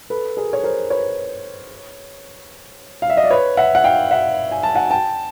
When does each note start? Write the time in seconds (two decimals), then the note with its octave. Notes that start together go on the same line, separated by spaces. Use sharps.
0.10 A4 B4
0.37 G#4 A#4
0.53 C#5
0.63 A#4 C5
0.90 B4 C#5
3.02 F5
3.10 E5
3.17 D#5
3.24 D5
3.31 B4 C#5
3.57 E5 F#5
3.75 F#5
3.84 F5 G5
4.11 E5 F#5
4.51 G#5
4.63 A5
4.75 F#5 G#5
4.91 G5 A5